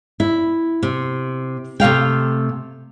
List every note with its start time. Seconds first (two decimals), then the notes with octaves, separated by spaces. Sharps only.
0.20 E4
0.83 C3
1.80 C3 A3 F5 G5